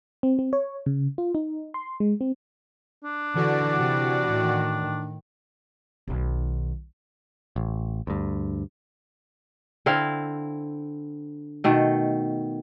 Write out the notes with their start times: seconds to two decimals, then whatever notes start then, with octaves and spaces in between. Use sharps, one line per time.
0.23 C4
0.39 C4
0.53 C#5
0.86 C#3
1.18 F4
1.35 D#4
1.74 C6
2.00 G#3
2.21 C4
3.04 D4
3.35 D3 E3 F#4 D5
3.77 C3
4.29 A2 D#3
6.08 B1 D#3
7.56 A1
8.07 D2 G2
9.86 D3 C4 E4 F5
11.64 B2 D#3 A3